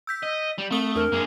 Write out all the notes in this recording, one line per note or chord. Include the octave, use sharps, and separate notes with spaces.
E6 G6 B6
D#5
G3
A3 C4 D#6 G7
E2 D4 A#4
F#2 A#3 G#4